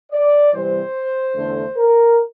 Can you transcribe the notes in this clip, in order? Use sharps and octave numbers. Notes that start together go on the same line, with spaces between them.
D5
C3 E3 G3 C4 C5
E2 D3 A3
A#4